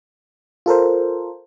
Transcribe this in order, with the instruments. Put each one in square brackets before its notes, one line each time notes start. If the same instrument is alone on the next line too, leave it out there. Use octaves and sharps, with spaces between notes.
[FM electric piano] F4 A4 A#4 C5